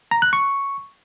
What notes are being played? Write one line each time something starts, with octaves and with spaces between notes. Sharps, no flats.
A#5
F#6
C#6